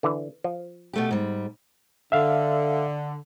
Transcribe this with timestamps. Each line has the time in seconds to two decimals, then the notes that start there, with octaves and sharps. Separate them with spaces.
0.03 D3 E3
0.44 F3
0.93 B2 A3 G4
1.11 G#2 G3
2.12 D3 E5 F5